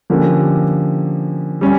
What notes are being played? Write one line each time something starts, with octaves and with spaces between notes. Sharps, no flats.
D3 F3 A#3 C#4 G4
G3 C#4